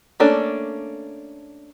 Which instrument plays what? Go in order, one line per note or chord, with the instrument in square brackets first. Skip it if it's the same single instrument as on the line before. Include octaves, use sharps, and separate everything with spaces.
[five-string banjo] A3 A#3 C#4 D4 A4